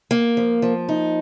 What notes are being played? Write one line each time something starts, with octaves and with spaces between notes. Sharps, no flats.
A#3
F3
F3
D#4